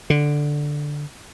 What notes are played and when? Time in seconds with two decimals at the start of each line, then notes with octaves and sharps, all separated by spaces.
0.10 D3